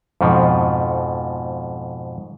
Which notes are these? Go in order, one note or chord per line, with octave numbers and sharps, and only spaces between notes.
F2 G#2 B2 F3